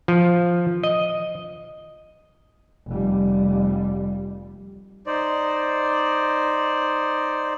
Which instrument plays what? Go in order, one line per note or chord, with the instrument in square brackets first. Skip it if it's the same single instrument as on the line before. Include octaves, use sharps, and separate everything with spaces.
[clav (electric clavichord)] F3
D#5
[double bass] F1 G3
[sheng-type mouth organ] D#4 C5 D5